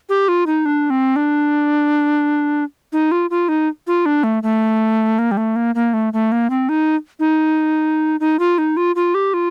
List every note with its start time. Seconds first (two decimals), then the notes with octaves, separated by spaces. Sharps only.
0.09 G4
0.28 F4
0.46 D#4
0.66 D4
0.90 C4
1.16 D4
2.93 D#4
3.12 F4
3.30 F4
3.49 D#4
3.87 F4
4.06 D4
4.24 A3
4.43 A3
5.19 A#3
5.31 G3
5.37 A3
5.56 A#3
5.75 A#3
5.94 A3
6.13 A3
6.32 A#3
6.50 C4
6.69 D#4
7.20 D#4
8.20 D#4
8.39 F4
8.58 D#4
8.77 F4
8.96 F4
9.15 G4
9.34 F4